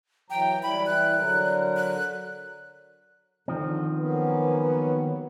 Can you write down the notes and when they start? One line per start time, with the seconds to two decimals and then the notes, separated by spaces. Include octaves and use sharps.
0.30 E3 F#3 G5 A#5
0.63 E3 G3 E4 B5
0.86 F#6
1.17 D3 F#3 A#4
1.76 F#6
3.48 D3 D#3 F3 C4
3.99 F#3 A#3 B3 C#4